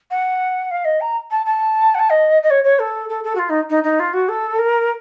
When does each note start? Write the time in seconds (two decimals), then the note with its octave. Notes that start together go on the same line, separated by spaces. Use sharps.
0.11 F#5
0.71 F5
0.85 D#5
1.01 A#5
1.31 A5
1.45 A5
1.95 F#5
1.99 A5
2.10 D#5
2.42 D#5
2.50 C#5
2.64 C#5
2.79 A4
3.09 A4
3.24 A4
3.35 F#4
3.39 F4
3.49 D#4
3.70 D#4
3.83 D#4
3.99 F4
4.13 F#4
4.28 A4
4.58 A#4